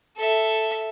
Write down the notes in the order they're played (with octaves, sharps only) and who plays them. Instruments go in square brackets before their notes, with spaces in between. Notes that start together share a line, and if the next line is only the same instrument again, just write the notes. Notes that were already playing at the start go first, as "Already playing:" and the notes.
[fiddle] A4 E5